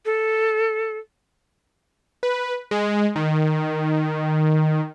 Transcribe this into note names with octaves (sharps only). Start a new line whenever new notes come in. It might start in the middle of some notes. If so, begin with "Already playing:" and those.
A4
B4
G#3
D#3